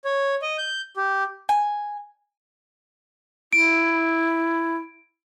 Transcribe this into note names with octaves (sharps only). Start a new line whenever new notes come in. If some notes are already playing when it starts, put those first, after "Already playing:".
C#5
D#5
G6
G4
G#5
E4 D7